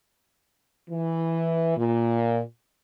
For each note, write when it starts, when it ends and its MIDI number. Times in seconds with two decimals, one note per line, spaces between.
0.90 1.74 52
1.77 2.41 46